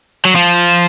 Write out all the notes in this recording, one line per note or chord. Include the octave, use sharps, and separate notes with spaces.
F#3
F3